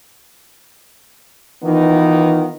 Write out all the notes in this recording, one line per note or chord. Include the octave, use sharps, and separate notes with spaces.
D#3 E3 B3 D#4 F4